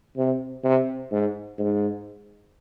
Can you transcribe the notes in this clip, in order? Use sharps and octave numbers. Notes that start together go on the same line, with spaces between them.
C3
C3
G#2
G#2